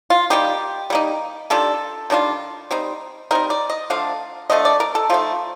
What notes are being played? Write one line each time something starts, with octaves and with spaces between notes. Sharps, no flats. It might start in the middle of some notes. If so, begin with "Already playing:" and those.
F4
G3 A#3 D#4 G4
G3 A#3 D#4
D#3 G3 D4 F4 A4
D#3 G3 D4 F4
G3 C4 D#4
G3 C4 D#4 A#4
D5
D#5
D3 F3 A3 D4 F5
D3 F3 A3 D4 D#5
D5
A#4
A4
F3 A3 D#4 F4